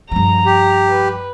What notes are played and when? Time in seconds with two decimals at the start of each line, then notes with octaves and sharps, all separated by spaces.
0.11 G2 F3 A#5
0.46 G4
0.88 B4